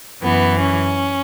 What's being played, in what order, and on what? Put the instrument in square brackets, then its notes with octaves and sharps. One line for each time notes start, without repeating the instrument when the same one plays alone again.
[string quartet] F#2 E3 B3
C#4